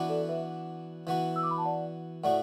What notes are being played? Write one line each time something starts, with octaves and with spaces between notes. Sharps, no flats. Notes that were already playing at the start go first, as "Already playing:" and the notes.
Already playing: E3 B3 D4 F#4
A4 D5
B4 E5
E3 B3 F#4
E6
D6
B5
A5
D5 F#5
A2 A3 F#4 D5 F#5